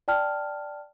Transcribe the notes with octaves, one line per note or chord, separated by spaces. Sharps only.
D5 G5 A5 F6